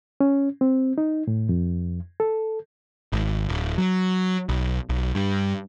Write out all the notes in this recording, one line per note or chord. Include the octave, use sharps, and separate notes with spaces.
C#4
C4
D#4
A2
F2
A4
G#1
D1
F#3
B1
B1
G2